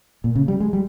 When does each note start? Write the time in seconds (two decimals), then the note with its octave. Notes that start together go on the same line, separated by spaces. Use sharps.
0.24 A#2
0.36 C#3
0.48 G3
0.60 G#3
0.73 G3